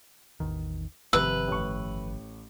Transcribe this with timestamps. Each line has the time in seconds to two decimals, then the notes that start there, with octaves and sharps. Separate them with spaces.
0.40 A1 E2 D#3
1.13 G1 C3 D#3 F3 B4 E6
1.48 A1 C#6